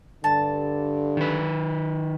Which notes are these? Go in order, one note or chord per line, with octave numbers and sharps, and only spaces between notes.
G2 D3 A5
D#3 B4